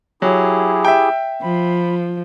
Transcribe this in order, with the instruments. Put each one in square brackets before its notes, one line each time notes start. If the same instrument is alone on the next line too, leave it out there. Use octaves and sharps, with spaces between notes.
[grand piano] F#3 [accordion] E4 G4 G#4
[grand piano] E5 G5
[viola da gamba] F3 [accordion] B5